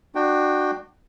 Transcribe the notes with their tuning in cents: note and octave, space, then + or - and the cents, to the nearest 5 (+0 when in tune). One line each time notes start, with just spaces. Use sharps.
D4 +30 F#4 +0 G5 +0